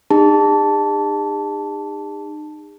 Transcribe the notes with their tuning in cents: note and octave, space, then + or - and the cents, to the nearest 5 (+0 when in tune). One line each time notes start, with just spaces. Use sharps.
D#4 -30 G#4 -45 A5 +0